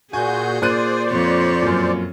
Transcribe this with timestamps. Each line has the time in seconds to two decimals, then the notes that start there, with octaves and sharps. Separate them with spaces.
0.13 A#2 F#4 G#4 G#5 G6
0.62 A#2 C5 D5 F#6 D#7
1.11 F2 C#5
1.62 F#2 A#2